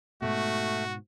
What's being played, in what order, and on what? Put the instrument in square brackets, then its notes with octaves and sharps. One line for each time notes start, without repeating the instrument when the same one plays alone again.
[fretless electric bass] G#2 B2 [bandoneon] A3 [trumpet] F#4